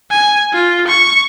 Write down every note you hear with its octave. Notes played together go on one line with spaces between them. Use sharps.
G#5
F4
C#6